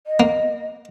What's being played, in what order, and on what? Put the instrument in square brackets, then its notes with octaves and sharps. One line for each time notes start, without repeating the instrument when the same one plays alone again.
[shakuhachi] D#5
[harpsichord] A#3